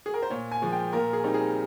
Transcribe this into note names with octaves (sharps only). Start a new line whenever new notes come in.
G#4
A#4
C5
A#2 C#5
G#5
F3 G#3
G5
A#2 A#4
G#4
G3 C4 D#4
G#4